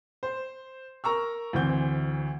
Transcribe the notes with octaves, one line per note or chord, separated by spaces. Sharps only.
C5
A#4 A#5 C#6 E6
D2 E3 C4 G6